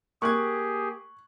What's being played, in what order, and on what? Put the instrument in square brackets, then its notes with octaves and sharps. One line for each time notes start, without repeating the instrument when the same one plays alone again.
[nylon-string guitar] A#3 [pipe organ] G4 G#4 [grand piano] C#6 F#6 G#6